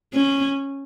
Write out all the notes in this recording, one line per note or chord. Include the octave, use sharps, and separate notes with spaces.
C#4